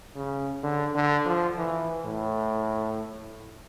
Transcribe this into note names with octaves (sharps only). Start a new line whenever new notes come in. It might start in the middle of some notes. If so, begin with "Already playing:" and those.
C#3
D3
D3
F3
E3
A2